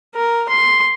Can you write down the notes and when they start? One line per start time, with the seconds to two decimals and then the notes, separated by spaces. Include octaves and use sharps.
0.15 A#4
0.49 C6